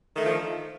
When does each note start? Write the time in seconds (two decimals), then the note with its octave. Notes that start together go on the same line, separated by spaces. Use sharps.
0.14 D#3
0.18 A3
0.21 D3
0.25 F3